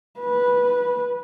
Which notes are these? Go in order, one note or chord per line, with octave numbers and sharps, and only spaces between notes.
B4